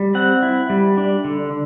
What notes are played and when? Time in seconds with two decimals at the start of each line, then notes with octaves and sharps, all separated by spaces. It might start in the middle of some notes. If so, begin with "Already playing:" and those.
Already playing: G3
0.15 C4 F#5
0.43 E4
0.70 G3
0.97 D4
1.25 D3